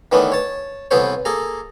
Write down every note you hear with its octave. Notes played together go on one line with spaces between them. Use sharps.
D#3 E3 A3 B3 C#4 D4
C#5 A5
C2 E3 B3 A4 C5 C#5
A#3 G#4 A4 A#5